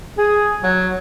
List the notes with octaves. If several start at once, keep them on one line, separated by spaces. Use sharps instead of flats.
G#4
F#3